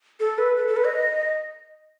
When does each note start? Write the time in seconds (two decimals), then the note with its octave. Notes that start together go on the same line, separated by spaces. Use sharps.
0.20 A4
0.38 B4
0.57 A4
0.67 A4
0.76 B4
0.85 D#5